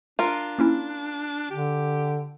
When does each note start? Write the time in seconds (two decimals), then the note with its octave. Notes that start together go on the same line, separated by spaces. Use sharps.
0.19 D4 F4 A#4
0.59 A#3 C#4 E4
1.50 D3 G4